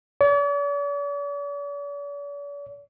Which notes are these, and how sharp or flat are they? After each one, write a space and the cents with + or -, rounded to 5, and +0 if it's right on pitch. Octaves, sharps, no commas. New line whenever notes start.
D5 -45